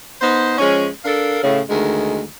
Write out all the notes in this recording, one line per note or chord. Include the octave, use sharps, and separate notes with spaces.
B3 D#4 C5
F3 G#3 C#4
D4 A4 A#4 F5
A2 C#3
D2 D#3 G#3